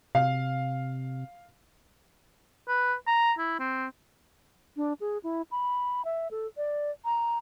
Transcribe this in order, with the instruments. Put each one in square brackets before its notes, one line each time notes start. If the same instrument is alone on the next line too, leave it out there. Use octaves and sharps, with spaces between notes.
[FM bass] C3 [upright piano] F5
[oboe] B4
A#5
E4
C4
[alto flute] D4
G#4
E4
B5
E5
A4
D5
A#5